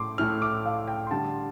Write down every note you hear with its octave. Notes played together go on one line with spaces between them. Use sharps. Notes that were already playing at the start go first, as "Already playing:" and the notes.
Already playing: A2 A3 C6 D6
A2 A3 F6
D6
F5
G5
C6
D3 G3 A5